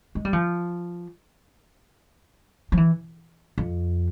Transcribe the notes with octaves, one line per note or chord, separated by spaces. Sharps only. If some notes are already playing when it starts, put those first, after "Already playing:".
G#3
G3
F3
F3
E3
F2